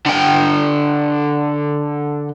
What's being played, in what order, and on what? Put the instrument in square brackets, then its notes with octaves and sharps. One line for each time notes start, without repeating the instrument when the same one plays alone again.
[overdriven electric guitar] D3 G5